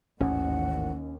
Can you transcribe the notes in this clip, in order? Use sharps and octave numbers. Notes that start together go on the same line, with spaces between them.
A1 D#2 G#2 C#4 F#5